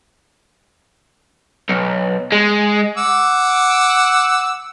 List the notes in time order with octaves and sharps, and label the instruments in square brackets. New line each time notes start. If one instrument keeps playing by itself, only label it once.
[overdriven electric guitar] B1
G#3
[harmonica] F#5 D6 E6